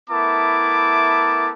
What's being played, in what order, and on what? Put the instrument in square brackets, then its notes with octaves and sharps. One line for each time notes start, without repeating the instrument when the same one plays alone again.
[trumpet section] A3 B3 E4 A#4 A5 D6